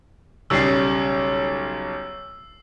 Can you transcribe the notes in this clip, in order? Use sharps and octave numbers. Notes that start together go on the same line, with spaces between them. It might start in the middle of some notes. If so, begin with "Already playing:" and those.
B1 C#3 G3 E6 C7